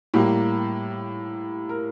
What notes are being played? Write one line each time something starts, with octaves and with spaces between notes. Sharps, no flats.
A2 G3 A#3 G4
A#4